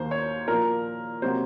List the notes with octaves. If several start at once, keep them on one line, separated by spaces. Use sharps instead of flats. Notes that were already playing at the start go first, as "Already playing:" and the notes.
Already playing: D#2 D#3 A#3 C5
C#5
A#2 F3 A#3 A#4
C3 F#3 A#3 C5